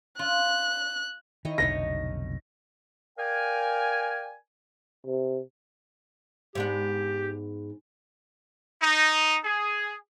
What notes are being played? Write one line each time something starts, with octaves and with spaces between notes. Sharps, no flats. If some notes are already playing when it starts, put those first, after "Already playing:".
F4 F#6
D#3 E4 C#5 D#5
F1 B1 D3 D#4 C#5 D#5 A#6
A#4 D5 F5 G5 G#5
C3
G#2 B3 D4 G4
D#4
G#4